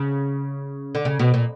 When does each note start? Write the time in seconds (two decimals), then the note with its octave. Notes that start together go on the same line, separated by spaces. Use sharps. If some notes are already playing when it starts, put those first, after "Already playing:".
Already playing: C#3
0.95 D3
1.05 C#3
1.19 B2
1.34 A#2